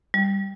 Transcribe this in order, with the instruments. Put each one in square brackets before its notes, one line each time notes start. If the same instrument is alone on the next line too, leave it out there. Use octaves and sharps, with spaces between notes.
[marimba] G3